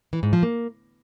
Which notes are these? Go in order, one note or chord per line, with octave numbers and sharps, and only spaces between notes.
E3
G#2
F3
A#3